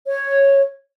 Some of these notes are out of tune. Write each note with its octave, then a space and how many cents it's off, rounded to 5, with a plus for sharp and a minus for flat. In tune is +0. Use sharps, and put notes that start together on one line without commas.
C#5 -5